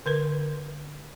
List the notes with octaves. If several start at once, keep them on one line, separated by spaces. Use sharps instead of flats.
D3 A#4 B4